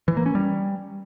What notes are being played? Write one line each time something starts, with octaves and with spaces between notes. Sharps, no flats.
E3
A#3
C#4
G3